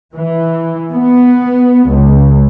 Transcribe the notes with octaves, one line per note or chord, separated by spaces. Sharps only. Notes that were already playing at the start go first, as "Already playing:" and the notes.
E3
B3
C#2